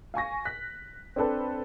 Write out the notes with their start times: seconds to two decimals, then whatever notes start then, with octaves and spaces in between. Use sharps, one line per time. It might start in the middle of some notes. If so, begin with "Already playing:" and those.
0.14 F5 G#5 C#6 A#6
0.45 F#6 B6
1.16 C4 D4 A4 B4